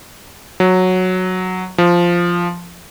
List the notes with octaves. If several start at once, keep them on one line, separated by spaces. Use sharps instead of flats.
F#3
F3